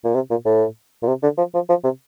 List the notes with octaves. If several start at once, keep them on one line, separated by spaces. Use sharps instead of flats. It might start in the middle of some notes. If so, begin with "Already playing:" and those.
A#2
C3
A#2
A2
A#2
C3
D3
F3
F3
F3
C3